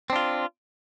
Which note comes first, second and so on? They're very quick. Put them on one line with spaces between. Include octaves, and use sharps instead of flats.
C4 D4 F4